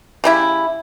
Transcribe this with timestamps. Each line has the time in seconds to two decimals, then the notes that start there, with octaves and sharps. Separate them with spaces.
0.24 C#3 G3 E4